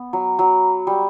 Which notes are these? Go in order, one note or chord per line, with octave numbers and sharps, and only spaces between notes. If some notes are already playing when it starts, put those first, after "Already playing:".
Already playing: B3
F#3
F#3
G3